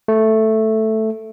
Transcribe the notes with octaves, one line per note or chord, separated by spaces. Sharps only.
A3